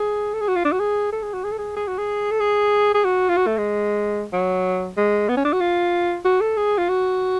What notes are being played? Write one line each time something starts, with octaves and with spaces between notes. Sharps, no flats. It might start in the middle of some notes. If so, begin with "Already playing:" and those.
Already playing: G#4
A4
G#4
F#4
F4
D4
F#4
G#4
A4
G#4
F#4
G#4
A4
G#4
G#4
F#4
G#4
A4
G#4
G#4
F#4
F4
F#4
A3
G#3
F#3
G#3
B3
C#4
D4
F#4
F4
F#4
A4
G#4
F4
F#4